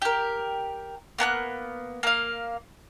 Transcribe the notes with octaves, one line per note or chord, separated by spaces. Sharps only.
G4 A#4
A#3 B3 A5 F#6
A#3 F5